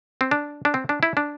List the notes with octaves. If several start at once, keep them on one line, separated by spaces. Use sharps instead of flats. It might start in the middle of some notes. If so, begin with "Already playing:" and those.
C4
D4
D4
C4
D4
E4
D4